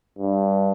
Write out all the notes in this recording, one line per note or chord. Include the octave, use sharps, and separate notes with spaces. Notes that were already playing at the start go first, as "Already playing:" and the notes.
G2